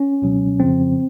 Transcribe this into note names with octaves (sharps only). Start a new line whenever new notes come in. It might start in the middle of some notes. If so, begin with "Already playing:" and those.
Already playing: C#4
C#2 B2 F#3
F2 C#3 F3 C4